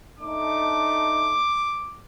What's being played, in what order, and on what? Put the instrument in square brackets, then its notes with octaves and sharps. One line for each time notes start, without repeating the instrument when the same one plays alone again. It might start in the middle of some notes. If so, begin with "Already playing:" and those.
[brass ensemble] A3 D4 D#4 [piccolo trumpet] D6